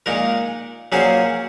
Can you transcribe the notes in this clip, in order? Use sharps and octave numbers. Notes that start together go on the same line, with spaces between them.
A#2 G#3 D#4 A#4
A#2 F#3 C#4 G#4 C5